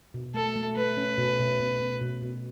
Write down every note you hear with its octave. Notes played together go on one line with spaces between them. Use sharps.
B2
A3 A4
A3
A3 B4
C#4
B2
B2
B2
B2
B2
B2